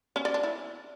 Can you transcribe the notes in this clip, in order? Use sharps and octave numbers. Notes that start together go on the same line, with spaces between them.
C#4
D5
D4
E4